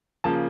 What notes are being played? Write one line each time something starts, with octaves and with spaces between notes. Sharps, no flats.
C#3 F3 A#3 A5